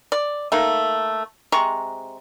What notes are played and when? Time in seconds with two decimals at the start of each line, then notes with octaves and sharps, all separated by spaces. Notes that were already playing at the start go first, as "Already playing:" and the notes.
0.12 D5
0.52 A3 A#3 D#4
1.52 C3 G#3 A#5 C#6